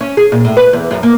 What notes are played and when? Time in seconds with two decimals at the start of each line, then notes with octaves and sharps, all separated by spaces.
0.01 C#4
0.17 G#4
0.32 A#2
0.45 A2
0.57 B4
0.73 E2
0.91 F#2
1.03 A#3